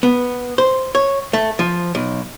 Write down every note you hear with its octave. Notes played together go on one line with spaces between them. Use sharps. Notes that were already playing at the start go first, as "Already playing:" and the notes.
B3
C5
C#5
A3
F3
B1